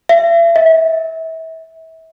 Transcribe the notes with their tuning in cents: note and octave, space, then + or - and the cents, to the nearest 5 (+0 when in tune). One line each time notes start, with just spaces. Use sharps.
E5 +40
E5 -30